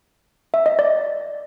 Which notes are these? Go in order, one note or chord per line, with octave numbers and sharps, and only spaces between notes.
E5
D#5
D5